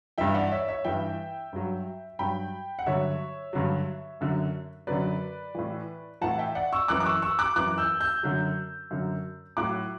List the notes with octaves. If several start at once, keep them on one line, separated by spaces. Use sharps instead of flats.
G2 E3 E5 G5
D5 F#5
C#5 E5
C#5 E5
G2 E3 E5 G5
G2 F#3
G2 F#3 G5 B5
F#5
G2 D3 F#3 C#5 E5
G2 D3 F#3
F#2 D3 F#3
F#2 D3 F#3 B4 D5
A2 E3
A2 E3 F#5 A5
E5 G5
D5 F#5
C#6 E6
F#2 E3 D6 F#6
D6
C#6 E6
C#6 E6
D6 F#6
F#2 E3 D6 F#6
E6 G6
E6 G6
F#2 D3 F#3
F#2 D3 F#3
A2 F#3 D6 F#6